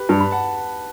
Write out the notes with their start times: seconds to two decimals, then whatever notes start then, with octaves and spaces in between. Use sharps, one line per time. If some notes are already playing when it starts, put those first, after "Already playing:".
Already playing: G4 B4
0.09 G2 A5
0.21 B5
0.31 F#5 A5